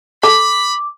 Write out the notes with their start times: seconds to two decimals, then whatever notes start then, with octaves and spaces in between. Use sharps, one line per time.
0.23 A4 B5 D6